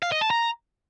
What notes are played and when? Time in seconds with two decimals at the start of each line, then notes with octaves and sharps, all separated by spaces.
0.03 F5
0.12 D#5
0.21 A5
0.31 A#5